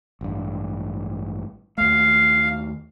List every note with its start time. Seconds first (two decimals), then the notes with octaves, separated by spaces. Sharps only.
0.21 A1 G2
1.78 D#2 A3 F5